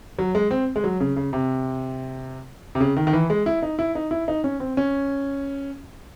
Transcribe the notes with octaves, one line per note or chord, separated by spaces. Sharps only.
F#3
G#3
C4
G#3
F#3
C#3
C#3
C3
C3
C#3
D#3
D#3
E3
G#3
E4
D#4
E4
D#4
E4
D#4
C#4
C4
C#4